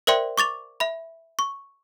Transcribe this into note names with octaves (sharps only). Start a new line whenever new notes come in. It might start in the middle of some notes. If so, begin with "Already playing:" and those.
A#4 C5 D5 E5 G5 C6
C#6 D6 A6 F7
E5 B5
C#6